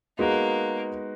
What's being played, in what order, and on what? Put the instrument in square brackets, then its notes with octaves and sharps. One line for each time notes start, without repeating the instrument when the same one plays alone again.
[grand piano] G#3 B3 D#4 F#4 [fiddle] A#3